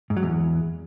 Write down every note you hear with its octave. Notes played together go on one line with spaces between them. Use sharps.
G#2
F#3
E2